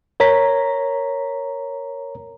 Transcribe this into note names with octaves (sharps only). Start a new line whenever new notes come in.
A#4 C#5 A#5 B6